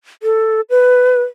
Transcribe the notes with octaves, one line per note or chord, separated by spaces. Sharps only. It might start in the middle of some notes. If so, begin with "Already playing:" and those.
A4
B4